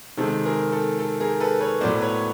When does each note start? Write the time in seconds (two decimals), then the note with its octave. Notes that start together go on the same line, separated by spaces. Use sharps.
0.17 C3 D#3 G#3 C4 A4
0.45 G#4 A#4
0.72 A4
0.99 A4
1.20 G#4 A#4
1.40 A4 B4
1.60 B4 C#5
1.81 A2 F#3 B3 C5 D5
2.01 B4 C#5